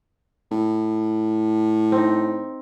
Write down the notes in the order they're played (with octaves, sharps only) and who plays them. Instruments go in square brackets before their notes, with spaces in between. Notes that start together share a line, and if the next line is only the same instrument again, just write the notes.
[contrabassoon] A2
[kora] C4 D#4